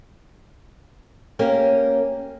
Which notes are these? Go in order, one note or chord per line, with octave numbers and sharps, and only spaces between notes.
A#3 C#4 G4 A#4